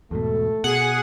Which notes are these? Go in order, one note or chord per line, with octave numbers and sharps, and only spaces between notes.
E2 G#2 B2 A3 A4
B2 G#4 F#5